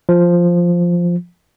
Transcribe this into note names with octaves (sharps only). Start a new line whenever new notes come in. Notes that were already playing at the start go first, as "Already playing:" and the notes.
F3